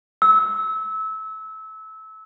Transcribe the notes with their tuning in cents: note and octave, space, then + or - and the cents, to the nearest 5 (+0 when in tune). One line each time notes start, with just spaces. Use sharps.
E6 -25